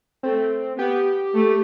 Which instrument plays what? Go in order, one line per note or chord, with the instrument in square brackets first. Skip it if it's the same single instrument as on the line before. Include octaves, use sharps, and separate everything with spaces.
[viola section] A3 [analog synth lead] C4
[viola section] B3 [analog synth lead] G4
[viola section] A3